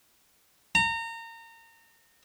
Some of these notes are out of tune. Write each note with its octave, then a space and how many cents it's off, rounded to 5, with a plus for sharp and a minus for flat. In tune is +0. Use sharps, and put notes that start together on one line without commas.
A#5 -30